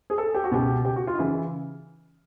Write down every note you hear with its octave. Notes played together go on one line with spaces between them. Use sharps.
G#4
A4
G4
F#4
C#2 B2 G4
G4
F#4
F4
D#4
C#3 E3 E4